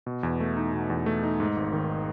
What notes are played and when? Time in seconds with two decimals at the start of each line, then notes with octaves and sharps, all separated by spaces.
0.06 B2
0.23 E2
0.40 A3
0.57 D#4
0.73 B2
0.90 E2
1.06 A3
1.23 D#4
1.40 G#2
1.56 G#1
1.73 D#3